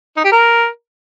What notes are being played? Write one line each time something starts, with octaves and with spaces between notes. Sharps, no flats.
D#4
G4
A#4